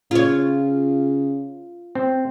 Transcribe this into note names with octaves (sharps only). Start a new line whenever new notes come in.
C#3 F4 C#5
C4